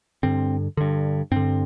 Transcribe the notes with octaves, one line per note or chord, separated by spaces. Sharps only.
G2 D3 C4
G2 D3
G2 D3 C4